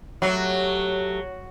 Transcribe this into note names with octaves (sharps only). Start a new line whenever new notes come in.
F#3 A3 G4